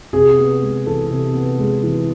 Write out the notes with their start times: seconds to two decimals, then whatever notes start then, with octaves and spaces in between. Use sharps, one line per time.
0.13 C3 G#4
0.38 B3
0.62 G#3
0.86 E3 A4
1.10 C3
1.34 B3
1.59 G#3
1.83 E3